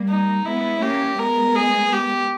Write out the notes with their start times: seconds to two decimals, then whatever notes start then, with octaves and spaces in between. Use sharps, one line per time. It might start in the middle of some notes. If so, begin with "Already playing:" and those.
Already playing: G3 A#3
0.09 D#4
0.45 G#3 B3 E4
0.82 A#3 C#4 G4
1.19 G#3 B3 A#4
1.55 G#4
1.92 G4